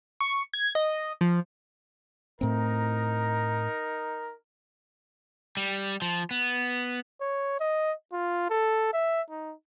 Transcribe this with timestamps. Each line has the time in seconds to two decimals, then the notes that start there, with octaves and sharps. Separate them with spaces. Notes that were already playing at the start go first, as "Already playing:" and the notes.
0.21 C#6
0.54 G#6
0.75 D#5
1.21 F3
2.41 A2 C4 D#4 A#4
5.57 G3
6.02 F3
6.31 B3
7.21 C#5
7.60 D#5
8.13 F4
8.50 A4
8.94 E5
9.30 D#4